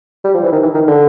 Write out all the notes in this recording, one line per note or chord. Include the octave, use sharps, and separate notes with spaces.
G3
F3
E3
D#3
E3
D#3
D3